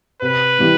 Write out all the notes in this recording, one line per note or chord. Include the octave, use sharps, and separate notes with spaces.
C3 B4
E3 G3